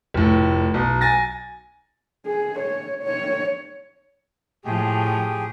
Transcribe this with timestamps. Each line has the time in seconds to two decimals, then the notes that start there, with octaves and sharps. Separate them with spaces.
0.14 F1 A2
0.74 B1
1.01 G#5 A6 A#6
2.27 G#4
2.59 C#5
3.03 C#5
4.65 A2 F3 G4 G#4